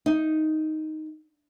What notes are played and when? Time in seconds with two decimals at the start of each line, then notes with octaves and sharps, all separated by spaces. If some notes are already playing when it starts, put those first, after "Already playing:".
0.06 D#4